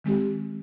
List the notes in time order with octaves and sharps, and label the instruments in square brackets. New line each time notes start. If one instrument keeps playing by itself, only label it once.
[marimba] D#3 G#3 C4 G4